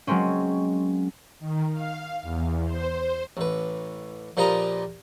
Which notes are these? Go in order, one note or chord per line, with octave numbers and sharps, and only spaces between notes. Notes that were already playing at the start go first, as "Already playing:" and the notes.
F#3 G#3 A#3 C4 C#4
D#3
F5
E2
C5
A1 B4
A#2 F3 G4 B4 D#5 A#5